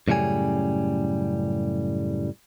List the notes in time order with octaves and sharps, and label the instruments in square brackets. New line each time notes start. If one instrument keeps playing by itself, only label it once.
[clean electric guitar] F#2 A2 C#3 G3 G#5